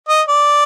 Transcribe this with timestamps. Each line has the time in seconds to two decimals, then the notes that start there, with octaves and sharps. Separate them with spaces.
0.09 D#5
0.28 D5